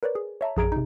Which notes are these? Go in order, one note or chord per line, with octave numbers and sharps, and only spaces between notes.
A#4 B4 C#5 D5
G#4
C#5 E5 A5 A#5
A#1 F#2 G#4 A#5 G#6 D7
C3 D#4